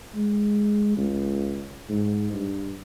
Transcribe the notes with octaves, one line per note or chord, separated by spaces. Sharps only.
G#3
C#2
G#2
G2